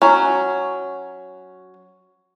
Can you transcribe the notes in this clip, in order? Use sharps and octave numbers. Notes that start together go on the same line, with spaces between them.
F#3 C#4